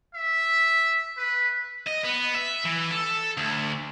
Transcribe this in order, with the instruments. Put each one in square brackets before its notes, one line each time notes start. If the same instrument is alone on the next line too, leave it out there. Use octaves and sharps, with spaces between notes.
[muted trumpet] E5
B4
[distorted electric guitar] D#5
B3
E5
E3
A4
D2